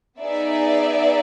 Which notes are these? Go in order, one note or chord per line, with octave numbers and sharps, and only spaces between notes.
B3 D#4 G#4 D5 E5